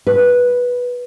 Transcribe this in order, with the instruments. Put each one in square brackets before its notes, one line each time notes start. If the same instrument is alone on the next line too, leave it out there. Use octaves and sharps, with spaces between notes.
[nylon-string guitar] B4